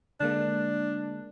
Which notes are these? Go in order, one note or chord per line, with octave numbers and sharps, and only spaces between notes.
D3 G#3 A#3 D4